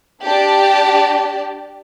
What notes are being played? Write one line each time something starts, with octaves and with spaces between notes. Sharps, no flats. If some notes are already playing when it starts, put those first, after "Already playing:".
D4 G4 D5 A5